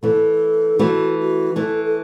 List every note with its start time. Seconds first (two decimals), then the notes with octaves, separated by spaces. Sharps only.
0.03 E3 A3 A4
0.79 E3 A3 F#4
1.19 F#4
1.56 E3 A3 A4
1.84 A4